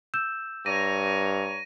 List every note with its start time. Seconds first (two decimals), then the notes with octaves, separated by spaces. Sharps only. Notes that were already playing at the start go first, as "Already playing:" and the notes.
0.14 E6 G6 E7
0.66 G2 C#5 A#5 A#6 D#7